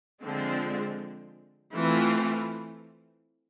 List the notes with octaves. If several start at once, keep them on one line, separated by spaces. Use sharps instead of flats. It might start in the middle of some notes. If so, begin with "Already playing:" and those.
D3 F3 G#3 C4
E3 A3 C4 F4